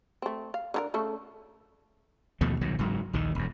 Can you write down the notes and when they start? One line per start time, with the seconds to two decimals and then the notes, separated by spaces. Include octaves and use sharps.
0.22 A3 C4
0.54 F5
0.74 D3 D#4 A#4
0.94 C#3 A3 A4
2.41 D#2 B2 F3 A3
2.61 C2 B2 D#3 F#3
2.79 F#1 G#2 F#3
3.13 A#1 D#2 D#3
3.35 E1 F#2